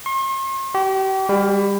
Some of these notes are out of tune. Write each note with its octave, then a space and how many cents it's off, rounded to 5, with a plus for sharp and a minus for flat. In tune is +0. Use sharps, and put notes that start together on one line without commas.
C6 +45
G4 -35
G3 +30